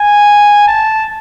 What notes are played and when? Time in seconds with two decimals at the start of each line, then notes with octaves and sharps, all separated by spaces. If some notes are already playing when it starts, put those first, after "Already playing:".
Already playing: G#5
0.67 A5